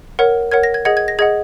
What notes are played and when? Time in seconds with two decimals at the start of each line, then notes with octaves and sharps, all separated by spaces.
0.19 A#4 C#5 F#5
0.51 A#4 C#5 F#5 G#6
0.63 A#6
0.74 G#6
0.85 G#4 D#5 F#5 G#6
0.97 G#6
1.08 A#6
1.19 G#4 D#5 F#5 G#6